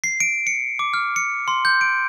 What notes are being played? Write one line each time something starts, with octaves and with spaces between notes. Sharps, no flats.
C7
D7
C#7
D6
F6
C#7
C6
G6
D7